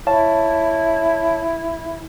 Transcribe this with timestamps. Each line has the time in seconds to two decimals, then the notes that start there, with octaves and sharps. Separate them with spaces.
0.07 E4 C#5 F5 A5